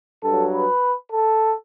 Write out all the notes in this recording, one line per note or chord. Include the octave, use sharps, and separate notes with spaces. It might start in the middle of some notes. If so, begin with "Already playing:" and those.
G2 F#3 A4
B4
A4